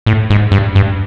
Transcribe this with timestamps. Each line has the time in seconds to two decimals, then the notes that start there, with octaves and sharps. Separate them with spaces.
0.06 A2
0.30 G#2
0.52 G2
0.75 G2